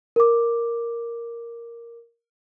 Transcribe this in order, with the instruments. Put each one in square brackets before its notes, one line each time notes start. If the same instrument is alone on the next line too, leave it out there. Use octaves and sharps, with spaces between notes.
[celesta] A#4 D6